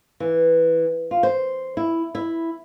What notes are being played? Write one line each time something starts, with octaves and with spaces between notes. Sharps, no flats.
E3
F4
C5
E4
E4